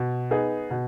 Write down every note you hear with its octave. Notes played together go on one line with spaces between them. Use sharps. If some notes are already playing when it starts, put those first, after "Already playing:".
Already playing: B2
B3 D#4 G#4
B2